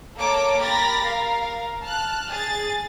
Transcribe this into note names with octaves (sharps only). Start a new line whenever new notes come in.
A#3 A4 C#5 A5 A#5 D6
G4 A#4 B5 A6 A#6
A#4 F5
A5 F6 F#6
G#4 A6